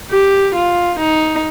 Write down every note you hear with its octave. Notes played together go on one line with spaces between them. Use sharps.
G4
F4
D#4